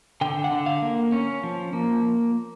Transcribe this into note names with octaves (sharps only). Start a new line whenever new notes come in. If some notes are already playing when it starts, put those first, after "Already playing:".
D3 G5
F#5
D3
F5
A#3
C#4
F3
A#3